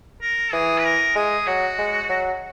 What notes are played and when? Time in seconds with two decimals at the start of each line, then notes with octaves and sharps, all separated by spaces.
0.21 A#4
0.53 E3 G#4
0.78 B4
0.84 A#4
1.15 G#3 G#4
1.47 F#3 F#4
1.78 G#3
2.09 F#3